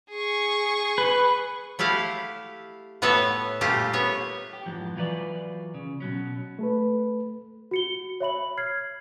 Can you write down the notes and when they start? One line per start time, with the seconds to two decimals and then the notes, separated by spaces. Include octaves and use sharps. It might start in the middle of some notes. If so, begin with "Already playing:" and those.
0.11 G#4 C#6
0.98 B4
1.79 A3 E4 G4 F5 F#5
3.02 A2 B3 A4 B4 C#5 E5
3.61 A#2 G3 A3 A#3 F4 G4
3.93 B3 C#5
4.53 G4
4.66 F2 G#2 E3 F3
4.96 E3 F#3 F4 A#4 B4 D5
5.74 C#3
6.00 B2 F#3 C#4
6.59 A3 A4 B4
7.71 F#4 C#7 G7
8.20 C#5 E5 B5 F#7
8.57 F6 G#6 C7